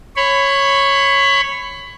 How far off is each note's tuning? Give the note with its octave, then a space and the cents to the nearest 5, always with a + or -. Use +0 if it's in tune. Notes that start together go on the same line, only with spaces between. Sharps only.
C#5 -5 B5 +20